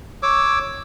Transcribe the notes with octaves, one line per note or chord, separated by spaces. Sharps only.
C#5 D6 E6